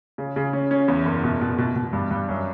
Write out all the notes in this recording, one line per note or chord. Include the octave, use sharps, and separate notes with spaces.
C#3
C#3
C#4
C#4
E2
F#1
B2
B2
B2
B2
G2
G2
F#2